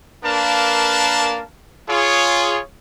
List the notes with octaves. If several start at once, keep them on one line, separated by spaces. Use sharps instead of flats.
A#3 D4 A#4 B4 F5 A5
F4 G#4 C#5